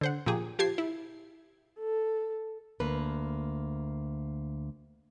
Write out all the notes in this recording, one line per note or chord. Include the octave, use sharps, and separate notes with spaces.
D3 C5 F#5
A#2 F3 G4 G#4
F3 G4 A5 G#6 C7
E4
A4
D2 A#3 B4